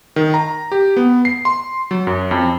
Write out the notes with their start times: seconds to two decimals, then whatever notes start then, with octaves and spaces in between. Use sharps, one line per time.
0.16 D#3
0.34 A#5
0.72 G4
0.97 B3
1.25 C7
1.45 C6
1.91 F#3
2.07 F#2
2.31 F2